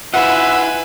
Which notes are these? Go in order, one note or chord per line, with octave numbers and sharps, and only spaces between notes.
E4 F4 B4 E5 F#5 G#5